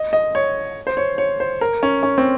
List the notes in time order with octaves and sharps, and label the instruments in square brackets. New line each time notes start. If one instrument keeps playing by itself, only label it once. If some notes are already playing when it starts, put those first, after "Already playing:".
Already playing: [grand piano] D#5
D#5
C#5
C5
C#5
C#5
C5
A#4
C#4
C#4
C4